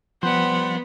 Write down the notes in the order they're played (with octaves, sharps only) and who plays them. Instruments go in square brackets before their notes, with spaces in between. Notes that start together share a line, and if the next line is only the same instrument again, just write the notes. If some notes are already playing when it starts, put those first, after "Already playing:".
[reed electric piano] F3 [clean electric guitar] G3 C5 [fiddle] B3 [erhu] F#5